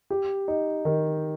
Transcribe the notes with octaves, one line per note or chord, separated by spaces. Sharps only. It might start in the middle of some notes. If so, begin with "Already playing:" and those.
G4
D#4
D#3